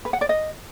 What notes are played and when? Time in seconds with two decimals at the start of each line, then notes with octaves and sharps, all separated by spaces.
0.05 B4
0.13 F#5
0.21 D5
0.29 D#5